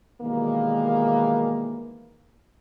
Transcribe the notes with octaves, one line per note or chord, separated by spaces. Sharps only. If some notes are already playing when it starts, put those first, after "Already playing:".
B2 D#3 E3 G3 G#3 A#3